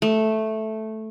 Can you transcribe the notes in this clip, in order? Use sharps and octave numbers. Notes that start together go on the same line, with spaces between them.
A3